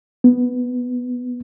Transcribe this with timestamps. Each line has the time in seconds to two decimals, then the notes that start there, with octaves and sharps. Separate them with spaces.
0.24 B3